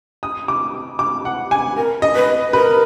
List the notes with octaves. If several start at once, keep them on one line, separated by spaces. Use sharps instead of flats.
D#6
D6
D6
F#5
G#5
A#4
D#5
B4
A#4 B4